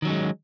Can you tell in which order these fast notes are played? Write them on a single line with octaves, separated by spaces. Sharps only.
D#3 F#3 C#4 G#3